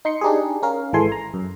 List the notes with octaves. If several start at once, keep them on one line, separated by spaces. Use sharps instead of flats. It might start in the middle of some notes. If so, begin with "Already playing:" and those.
D#4 C6 C#7
D4 D#4 G4 G#4
C#4 A#4 F5
G#1 E3 G#3 A4 G#5 C6
A#5
F#2